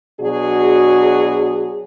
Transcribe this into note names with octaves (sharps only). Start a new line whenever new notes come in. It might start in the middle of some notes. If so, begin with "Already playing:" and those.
B2 F#3 D4 F#4 G#4